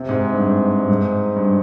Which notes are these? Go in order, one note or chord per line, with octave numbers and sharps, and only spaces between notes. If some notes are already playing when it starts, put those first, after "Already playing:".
Already playing: C3
G#2
G2
G#2
G2
G#2
G2